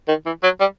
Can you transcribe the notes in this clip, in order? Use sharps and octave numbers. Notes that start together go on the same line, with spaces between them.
D#3
E3
F#3
G3